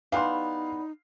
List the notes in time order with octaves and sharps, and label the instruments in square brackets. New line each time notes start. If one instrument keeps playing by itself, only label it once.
[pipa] E3 G3 B3 [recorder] D#4 [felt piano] F5 C6